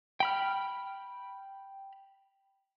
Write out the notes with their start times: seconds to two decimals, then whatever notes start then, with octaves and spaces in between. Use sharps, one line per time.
0.20 G5 B5 F6